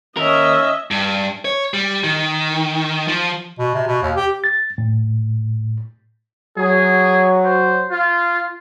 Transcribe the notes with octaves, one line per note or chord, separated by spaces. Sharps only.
D#2 C#4 A#4 D#5 E5
G2
C#5
G3
D#3
F3
B2
C3
B2
D#2
G4
A6
A2
F#3 G#4
C5
F4